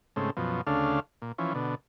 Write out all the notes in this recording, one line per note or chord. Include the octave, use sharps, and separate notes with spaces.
G#2 C#3 A3 C4
F#2 B2 F3
D2 C#3 A3 D4 F5
A#2
E3 F3 C#4
B2 D3